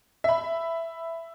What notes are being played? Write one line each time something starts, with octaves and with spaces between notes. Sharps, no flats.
E5 B5